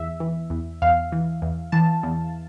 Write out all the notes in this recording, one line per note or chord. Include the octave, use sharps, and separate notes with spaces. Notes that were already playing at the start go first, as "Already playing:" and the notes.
Already playing: E2 E5
E3
E2
E2 F5
E3
E2
E3 A5
E2